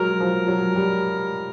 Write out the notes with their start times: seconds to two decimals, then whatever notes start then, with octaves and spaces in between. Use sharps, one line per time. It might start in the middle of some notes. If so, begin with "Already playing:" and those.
Already playing: F#3 G#3 A#4
0.20 F3
0.48 F#3
0.76 G3